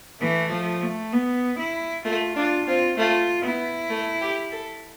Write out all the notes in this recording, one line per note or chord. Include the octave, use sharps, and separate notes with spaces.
E3 A3
F3
A3
B3
E4
A3 F4
D4 F4
C4 F4
A3 F4
B3 E4
A3
G4
A4